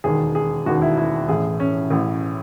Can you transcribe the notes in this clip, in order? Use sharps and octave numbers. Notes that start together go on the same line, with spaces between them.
E1 D#2 D#3 G#4
G#4
E1 D#2 D#3 F#4
E4
E4
A1 A2 E3 G#4
C#4
A1 A2 E3